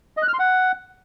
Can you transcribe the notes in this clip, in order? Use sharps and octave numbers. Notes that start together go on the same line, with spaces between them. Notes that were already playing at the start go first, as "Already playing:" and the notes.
D#5
F#6
F6
C6
F#5